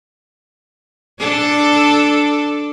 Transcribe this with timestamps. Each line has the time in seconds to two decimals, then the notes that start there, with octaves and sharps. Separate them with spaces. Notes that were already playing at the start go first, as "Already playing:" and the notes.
1.19 D4 A4 D5